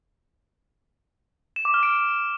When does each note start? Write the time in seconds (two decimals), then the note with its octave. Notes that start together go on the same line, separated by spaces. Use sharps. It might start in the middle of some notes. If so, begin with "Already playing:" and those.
1.56 E7
1.65 D6
1.74 F6
1.83 D7